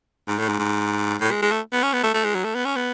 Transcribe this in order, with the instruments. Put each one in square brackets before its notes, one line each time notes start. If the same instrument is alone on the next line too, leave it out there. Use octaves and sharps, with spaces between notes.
[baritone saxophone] G#2
A2
G#2
G#2
A2
G#3
G#3
A3
B3
C#4
B3
A3
A3
G#3
F#3
A3
B3
C#4
B3